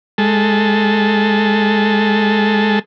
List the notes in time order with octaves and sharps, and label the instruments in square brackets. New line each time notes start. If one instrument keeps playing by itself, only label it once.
[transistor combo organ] G#3 A4